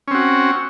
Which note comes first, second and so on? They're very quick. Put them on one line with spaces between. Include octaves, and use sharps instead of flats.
C#4 C4 F#4